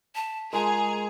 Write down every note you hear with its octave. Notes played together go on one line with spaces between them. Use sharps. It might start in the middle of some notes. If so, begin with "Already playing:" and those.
A5 B6
G#3 F4 G#4 A#4 A#5